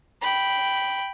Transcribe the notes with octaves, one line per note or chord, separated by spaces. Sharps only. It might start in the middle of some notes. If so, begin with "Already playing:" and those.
G5 B5